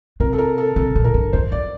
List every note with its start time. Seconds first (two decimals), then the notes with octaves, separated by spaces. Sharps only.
0.20 C3 A#4
0.33 A4
0.38 A#4
0.58 A4
0.76 C3 A4
0.95 A#2
1.04 A#4
1.14 G2
1.33 E2 C5
1.52 F2 D5